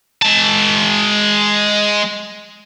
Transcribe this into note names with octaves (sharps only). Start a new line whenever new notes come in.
G#3 A5